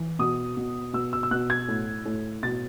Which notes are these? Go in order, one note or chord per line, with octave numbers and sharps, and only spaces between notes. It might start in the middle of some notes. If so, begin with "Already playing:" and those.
Already playing: E3
B2 D#6
B2
B2 E6
E6
E6
B2 F#6
G#6
A2
A2
B2 A6